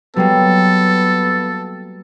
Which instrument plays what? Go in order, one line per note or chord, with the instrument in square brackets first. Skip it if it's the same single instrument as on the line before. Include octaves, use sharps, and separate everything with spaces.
[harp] F#3 G3 A#3 [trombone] B3 [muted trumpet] A4